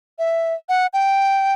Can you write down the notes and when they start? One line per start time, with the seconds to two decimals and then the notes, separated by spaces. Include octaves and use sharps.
0.19 E5
0.69 F#5
0.93 G5